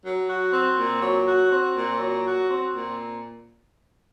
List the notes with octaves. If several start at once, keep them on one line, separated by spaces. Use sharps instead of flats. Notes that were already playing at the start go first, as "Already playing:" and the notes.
F#3
F#4
C4
A#2
F#3
F#4
C4
A#2
F#3
F#4
C4
A#2